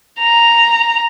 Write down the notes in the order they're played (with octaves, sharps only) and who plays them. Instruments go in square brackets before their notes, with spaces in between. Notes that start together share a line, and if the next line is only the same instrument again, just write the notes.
[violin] A#5